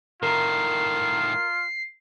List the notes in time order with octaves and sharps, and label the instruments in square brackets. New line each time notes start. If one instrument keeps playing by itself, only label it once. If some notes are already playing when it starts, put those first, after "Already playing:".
[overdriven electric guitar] A2 D#3 [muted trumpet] F4 [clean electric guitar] A#4 [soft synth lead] C7